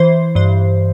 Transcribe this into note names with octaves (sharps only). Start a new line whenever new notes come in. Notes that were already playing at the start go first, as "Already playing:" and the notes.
Already playing: E3 C5
G2 C5